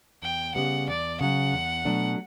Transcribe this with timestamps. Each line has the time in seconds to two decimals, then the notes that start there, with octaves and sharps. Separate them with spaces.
0.22 E2 G5
0.55 C#3 G3 B3 F#5
0.88 E2 D5
1.20 C#3 F#3 F#5
1.53 E2
1.85 B2 F#3 A3 D4